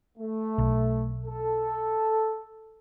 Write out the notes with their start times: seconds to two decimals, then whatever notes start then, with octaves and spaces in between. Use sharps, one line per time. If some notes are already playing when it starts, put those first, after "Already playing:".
0.18 A3
0.58 B1
1.26 A4